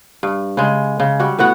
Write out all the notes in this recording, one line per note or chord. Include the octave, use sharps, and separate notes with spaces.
G2
C#3 G#3
C#3
G3 F#4
A2 B3 F#4 F#5